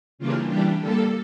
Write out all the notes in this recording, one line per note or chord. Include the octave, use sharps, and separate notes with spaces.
C#3 E3 G3 A#3 D4 F4
E3 G3 D4 G4
D3 G3 A#3 A4